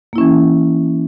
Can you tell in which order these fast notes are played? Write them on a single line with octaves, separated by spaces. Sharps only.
A#3 E4 C#4 E3